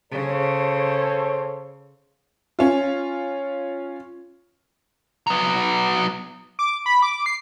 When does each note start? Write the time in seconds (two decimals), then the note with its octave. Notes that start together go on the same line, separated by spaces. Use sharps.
0.13 C#3 A4 C5 C#5
2.59 C#4 F4
5.27 F#3 B3
6.59 D6
6.86 B5
7.02 D6
7.26 C7